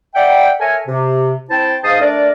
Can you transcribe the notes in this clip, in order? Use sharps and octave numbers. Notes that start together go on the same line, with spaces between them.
D5 E5 F#5 G5
A4 A#4 C#5 E5 G#5
C3
C4 E4 C5 G5 A5
G#2 C5 D#5 F5 A5 D#6
A3 D4 A#4 D5